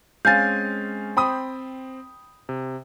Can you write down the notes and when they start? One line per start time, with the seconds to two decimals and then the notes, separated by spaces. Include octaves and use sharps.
0.25 G#3 C4 C#4 F5 G#5 G6 A6
1.17 C4 C5 G5 B5 D#6
2.49 C3